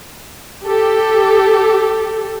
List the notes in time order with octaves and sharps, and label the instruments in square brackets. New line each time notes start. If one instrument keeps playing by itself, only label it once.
[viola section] G4 A4